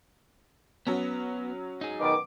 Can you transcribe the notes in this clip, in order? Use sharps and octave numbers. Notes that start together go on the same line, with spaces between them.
F#3 B3 C#4
D#4 G#4
B2 D#3 D6